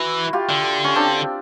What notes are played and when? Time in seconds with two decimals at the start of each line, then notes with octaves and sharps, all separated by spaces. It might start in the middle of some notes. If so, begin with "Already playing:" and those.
Already playing: E3 E4 F#4
0.33 F4 G4
0.49 D3
0.84 C#4
0.96 C4 D4